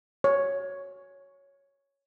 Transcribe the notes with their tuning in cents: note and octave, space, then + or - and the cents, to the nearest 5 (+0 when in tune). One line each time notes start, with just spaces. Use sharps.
C#5 +5